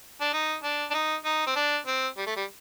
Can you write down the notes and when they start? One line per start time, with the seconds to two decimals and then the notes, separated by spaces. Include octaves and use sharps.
0.21 D4
0.33 D#4
0.63 D4
0.90 D4
0.94 D#4
1.25 D#4
1.47 C4
1.56 D4
1.86 C4
2.17 G3
2.27 A3
2.36 G3